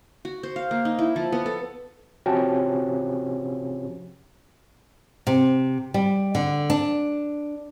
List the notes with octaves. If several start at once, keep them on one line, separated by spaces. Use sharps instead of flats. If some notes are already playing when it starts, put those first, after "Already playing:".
F#4
C5
F5
A#3
D#4
E4
F3
B3
A4
C3 F3 C#4 F#4 G5 A5
C3
G3
D3
D4